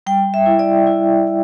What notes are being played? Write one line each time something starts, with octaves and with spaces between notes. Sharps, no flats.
G3 G5
E5
E4
D5
E4
E4